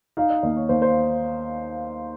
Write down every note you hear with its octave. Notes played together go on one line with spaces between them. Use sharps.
D#4 F5
D#5
D#2 D#5
C#5
D#2 C5
C5